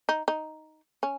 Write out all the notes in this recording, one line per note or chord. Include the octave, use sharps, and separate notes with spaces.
D#4
D#4
C#4